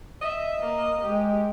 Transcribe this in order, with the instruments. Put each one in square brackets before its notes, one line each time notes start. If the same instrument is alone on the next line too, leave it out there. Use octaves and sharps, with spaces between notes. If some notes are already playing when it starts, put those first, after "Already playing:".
[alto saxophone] D#5 [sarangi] E5
[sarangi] A#3
[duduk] G#3 [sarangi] G4